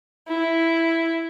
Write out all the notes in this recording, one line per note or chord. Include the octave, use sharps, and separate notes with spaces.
E4